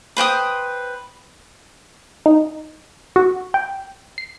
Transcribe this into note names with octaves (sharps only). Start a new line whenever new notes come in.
B4 C5 G5 D#6
D#4
F#4
G5
C7